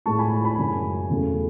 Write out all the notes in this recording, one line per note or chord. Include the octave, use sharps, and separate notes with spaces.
A2 G#3 A5 C#6
G#5 B5
G#5 B5
F#2 C#3 G#3
E2 C#3 F#3 A3